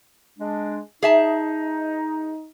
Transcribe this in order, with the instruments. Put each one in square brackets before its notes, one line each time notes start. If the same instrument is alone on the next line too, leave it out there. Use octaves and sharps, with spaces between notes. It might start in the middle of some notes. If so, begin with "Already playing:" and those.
[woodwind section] G#3 D4
[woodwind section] D#4 [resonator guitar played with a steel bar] G#4 E5 A5